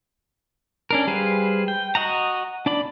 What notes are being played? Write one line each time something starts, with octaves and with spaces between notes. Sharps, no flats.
C#4 D4 A#4
G3 G#4 B4 C5 F5
G5
F#4 D#5 F#5 A#5
D4 D5 B5